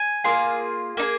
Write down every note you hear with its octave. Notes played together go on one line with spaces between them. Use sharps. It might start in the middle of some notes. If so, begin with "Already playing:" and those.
Already playing: G#5
A#3 F4 G#4
A#3 D#4
G#4